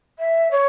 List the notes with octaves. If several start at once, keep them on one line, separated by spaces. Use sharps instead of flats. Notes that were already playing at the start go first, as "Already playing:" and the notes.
E5
C#5